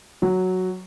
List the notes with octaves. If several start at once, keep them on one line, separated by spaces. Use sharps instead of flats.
F#3